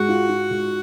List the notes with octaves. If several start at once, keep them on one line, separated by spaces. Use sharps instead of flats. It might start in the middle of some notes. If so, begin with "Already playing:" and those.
Already playing: G#2 G#3 F#4
F4
F4
G#2